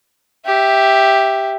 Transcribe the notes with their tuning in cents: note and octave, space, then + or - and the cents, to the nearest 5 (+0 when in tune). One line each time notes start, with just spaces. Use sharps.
G4 +0 E5 +0